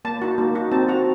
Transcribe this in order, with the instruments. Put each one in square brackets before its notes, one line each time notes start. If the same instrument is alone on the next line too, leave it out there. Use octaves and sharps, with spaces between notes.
[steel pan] A#3 A5
D#4 F#4
A#3
D#4 F#4
C4 A5
F#4 A#5